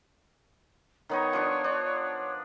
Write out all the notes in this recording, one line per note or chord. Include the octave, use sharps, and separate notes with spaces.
D#3 B3 D#4 C#5
F3 D4
D4